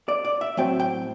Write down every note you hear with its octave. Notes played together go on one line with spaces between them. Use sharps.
D5
D5
E5
A2 F#3 A3 C4 G5
G5